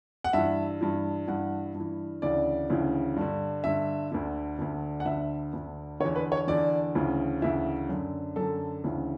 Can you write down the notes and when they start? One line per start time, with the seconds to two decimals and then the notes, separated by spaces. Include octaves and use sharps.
0.24 F#5
0.33 G2 E3 E5
0.81 G2 E3
1.27 G2 E3 F#5
1.74 G2
1.80 E3
2.22 D2 C#3 E3 D5
2.70 D2 C#3 E3
3.16 G2 D3
3.64 G2 D3 E5
4.12 D2 D3
4.59 D2 D3
5.00 F#5
5.06 D2 D3 E5
5.53 D2 D3
6.00 D3 C#5
6.05 E2
6.16 B4
6.32 C#5
6.47 E2 D3 D5
6.95 D2 C#3 E3
7.42 D2 C#3 E3 E5
7.89 F#2 D3
8.36 F#2 D3 A4
8.84 D2 C#3 E3